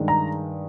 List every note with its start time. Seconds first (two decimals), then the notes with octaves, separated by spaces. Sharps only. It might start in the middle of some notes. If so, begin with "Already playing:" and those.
Already playing: G2 D#3 G#3 D4
0.08 A#5